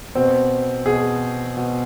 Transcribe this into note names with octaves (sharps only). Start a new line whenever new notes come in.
B2 C4
B2 G#4
B2